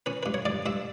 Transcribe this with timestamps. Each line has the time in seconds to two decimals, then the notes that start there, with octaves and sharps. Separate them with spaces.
0.06 C#4 B4
0.23 G2 B4
0.34 C#5
0.46 G2 D5
0.66 G2 E5